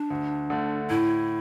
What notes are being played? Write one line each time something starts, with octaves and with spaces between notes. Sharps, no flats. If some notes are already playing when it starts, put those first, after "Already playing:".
Already playing: D4
D2
D3 A3
A2 E4